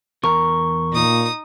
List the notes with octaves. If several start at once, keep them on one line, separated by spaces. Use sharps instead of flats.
E2 A#4 A#5 C#6
A#2 D#4 D#6